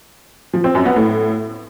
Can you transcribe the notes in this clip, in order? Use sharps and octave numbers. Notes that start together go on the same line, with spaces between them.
F3
C4
F#2
B3
A2